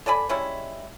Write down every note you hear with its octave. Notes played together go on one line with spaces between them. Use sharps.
A4 D5 G#5 B5
G3 G#3 C#4 E4